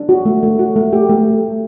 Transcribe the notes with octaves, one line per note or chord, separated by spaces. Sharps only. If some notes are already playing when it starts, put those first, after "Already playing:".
Already playing: D4
F#4
A3
A3
F#4
A3
G4
A3